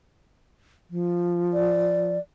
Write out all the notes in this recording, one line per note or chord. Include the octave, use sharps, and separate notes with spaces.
F3
D5